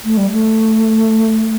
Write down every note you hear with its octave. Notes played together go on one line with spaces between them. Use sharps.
A3
G3
A3